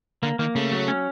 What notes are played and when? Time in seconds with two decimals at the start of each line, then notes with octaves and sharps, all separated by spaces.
0.23 D3 A#3
0.39 D#3 A#3
0.55 C#3 A3
0.72 F#3
0.88 C#4